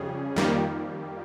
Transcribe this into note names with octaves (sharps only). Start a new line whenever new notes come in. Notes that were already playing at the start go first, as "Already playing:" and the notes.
Already playing: F2 C#3 G3 C#4 G#4
F2 D#3 G3 A#3